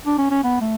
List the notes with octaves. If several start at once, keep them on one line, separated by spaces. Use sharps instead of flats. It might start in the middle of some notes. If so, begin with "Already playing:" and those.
D4
C#4
C#4
B3
A3